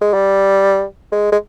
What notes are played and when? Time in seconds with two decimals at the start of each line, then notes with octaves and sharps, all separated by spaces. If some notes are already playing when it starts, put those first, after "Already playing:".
0.01 G#3
0.14 G3
1.12 G#3
1.32 G#3